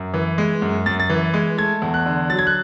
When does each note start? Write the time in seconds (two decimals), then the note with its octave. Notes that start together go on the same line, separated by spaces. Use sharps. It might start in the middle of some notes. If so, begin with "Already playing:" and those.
Already playing: F#2
0.14 E3
0.38 G#3
0.62 F#2
0.86 F#2 A6
1.00 A6
1.10 E3
1.34 G#3
1.58 A3 G#6
1.82 E2
1.94 F#6
2.06 D3
2.30 F#3 A6
2.39 G#6
2.47 F#6